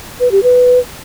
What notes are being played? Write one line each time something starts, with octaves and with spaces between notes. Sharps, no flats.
B4
G4
B4